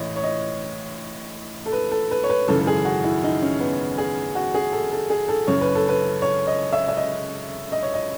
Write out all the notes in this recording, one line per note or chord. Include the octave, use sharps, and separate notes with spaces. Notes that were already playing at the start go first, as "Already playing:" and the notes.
Already playing: A1 A2 E3 C#5 D#5
C#5
D#5
A4
B4
A4
B4
C#5
B4
G#1 F#2 C#3 E3 A4
A4
G#4
F#4
E4
D#4
C#4
B3
G#4
F#4
G#4
A4
A4
G#4
A4
F#1 F#2 C#3 C#5
B4
A4
B4
C#5
D#5
E5
E5
D#5
D#5
C#5
D#5